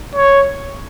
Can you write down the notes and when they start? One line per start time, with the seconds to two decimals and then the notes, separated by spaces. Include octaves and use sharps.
0.15 C#5